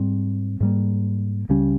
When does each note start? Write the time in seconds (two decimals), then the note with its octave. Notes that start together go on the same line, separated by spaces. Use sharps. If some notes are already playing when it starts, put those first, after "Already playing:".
Already playing: G#2 G3 C4
0.60 G#2 G3 A#3
1.49 C#2 C#3 G3 C#4